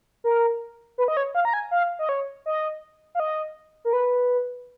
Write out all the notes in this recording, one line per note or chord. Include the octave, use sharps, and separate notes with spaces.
A#4
B4
D#5
C#5
F5
A#5
G#5
F5
D#5
C#5
D#5
F5
D#5
A#4
B4